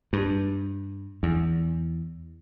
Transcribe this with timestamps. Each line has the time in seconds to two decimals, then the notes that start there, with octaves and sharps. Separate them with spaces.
0.13 G2
1.23 E2